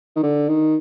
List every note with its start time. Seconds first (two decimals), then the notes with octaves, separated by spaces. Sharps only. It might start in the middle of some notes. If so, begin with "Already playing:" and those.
0.16 D#3
0.23 D3
0.49 D#3